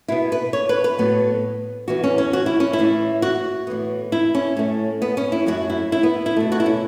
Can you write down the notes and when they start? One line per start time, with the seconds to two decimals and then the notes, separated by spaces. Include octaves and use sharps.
0.08 B2 B3 E4
0.32 B4
0.53 C#5
0.69 B4
0.84 B4
0.98 A2 F#3 B3
1.88 E2 E3 B3 F#4
2.04 C#4
2.18 C#4
2.33 F#4
2.46 E4
2.60 C#4
2.73 E4
2.78 A2 E3 A3
3.22 F#4
3.67 A2 E3 B3
4.12 E4
4.35 C#4
4.57 A2 A3
5.02 B3
5.17 C#4
5.32 E4
5.46 F#2 F#3 A3 F#4
5.70 E4
5.92 E4
6.03 B3
6.26 E4
6.36 B2 A3
6.52 F#4
6.60 E4
6.66 C#4